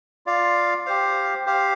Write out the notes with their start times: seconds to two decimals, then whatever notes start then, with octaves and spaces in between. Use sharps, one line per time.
0.27 F4 D5 F5
0.86 G4 C5 F5
1.46 G4 C5 F5